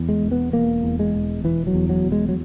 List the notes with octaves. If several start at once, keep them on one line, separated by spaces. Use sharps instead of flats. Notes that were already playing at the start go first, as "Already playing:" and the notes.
Already playing: E2
G#3
E1
B3
E1 A#3
E2
G#3
E1
E1 E3
F#3
E2
F#3
E1
G#3
F#3